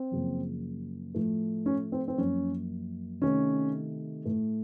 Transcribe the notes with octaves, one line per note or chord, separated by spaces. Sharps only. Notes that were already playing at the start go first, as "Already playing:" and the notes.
Already playing: C4
F#2 C#3 F3 A#3
A2 F3 A3
C#4
C4
C4
F#2 F3 A#3 C#4
C3 D#3 A3 C#4
A2 A3